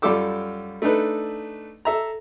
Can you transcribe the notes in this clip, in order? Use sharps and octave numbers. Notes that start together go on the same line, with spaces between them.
F#2 G3 F4 A4 D6 E6
A3 D4 D#4 A4 B4
A4 E5 A#5